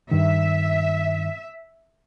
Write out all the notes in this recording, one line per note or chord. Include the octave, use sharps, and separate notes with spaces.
G2 D#3 E5